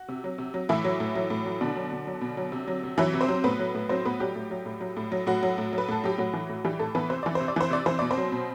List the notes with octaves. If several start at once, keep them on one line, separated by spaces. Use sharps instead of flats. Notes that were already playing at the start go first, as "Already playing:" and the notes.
Already playing: F#4
C3
F#3
C3
F#3
A2 E3 E4
F#3
A2
F#3
A2
F#3
B2 D3 D4
F#3
B2
F#3
B2
F#3
C3
F#3
C3
E3 F#3 E4
C3
C4 C5
F#3
A2 B3 B4
F#3
A2
F#3 C4 C5
A2 B3 B4
F#3 G3 G4
A2
F#3
A2
F#3
A2
F#3
A2 F#3 F#4
F#3
A2
F#3
B4
A2 A4
F#3 G4
A2 F#3 F#4
E3
A2
E3 G3 G4
A2 A3 A4
E3 B3 B4
C3 C5
E3 D5
C5
C3
D5
E3 C5
C3 D5
E3 C5
B2 D5
C4 C5
F#3
B2